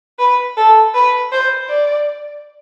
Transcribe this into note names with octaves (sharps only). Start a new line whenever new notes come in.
B4
A4
B4
C5
D5